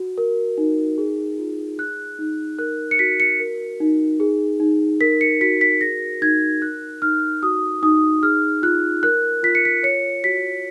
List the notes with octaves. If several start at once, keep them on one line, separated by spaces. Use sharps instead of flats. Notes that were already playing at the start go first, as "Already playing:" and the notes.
Already playing: F#4
A#4
D#4
G#4
F4
G#4 F#6
D#4
A#4 F#6
C#7
F#4 B6
C#7
A#4
D#4
G#4
D#4
A#4 B6
C#7
F#4 B6
B6
G#4 A#6
D#4 G#6
A#4 F#6
D#4 F6
F#4 D#6
D#4 D#6
G#4 F6
F4 F#6
A#4 F#6
F4 B6
C#7
B6
C#5 C#7
F#4 B6